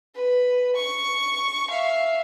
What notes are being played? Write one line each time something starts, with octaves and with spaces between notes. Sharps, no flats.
B4
C#6
E5 F5